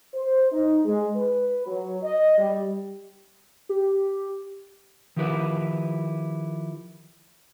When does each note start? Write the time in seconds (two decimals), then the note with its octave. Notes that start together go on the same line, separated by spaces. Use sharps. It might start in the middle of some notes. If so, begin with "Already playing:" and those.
0.14 C5
0.52 D#4
0.85 G#3
1.16 B4
1.66 F#3
2.03 D#5
2.38 G3
3.69 G4
5.16 D#3 F3 E4 G4 B4